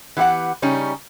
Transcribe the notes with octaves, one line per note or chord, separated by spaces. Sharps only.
E3 B3 G4 C#5 F#5
C#3 G3 C#4 D#4